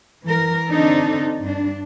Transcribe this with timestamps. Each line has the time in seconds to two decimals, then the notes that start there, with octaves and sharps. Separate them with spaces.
0.23 E3 A#4
0.69 D3 C4 D4 D#4 A4
1.39 G2 D4